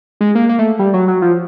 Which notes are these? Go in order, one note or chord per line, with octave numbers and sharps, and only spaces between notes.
G#3
A#3
A#3
A3
G3
F#3
F#3
F3